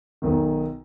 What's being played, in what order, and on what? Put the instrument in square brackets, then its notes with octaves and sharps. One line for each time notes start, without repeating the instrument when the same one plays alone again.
[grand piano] B1 D#3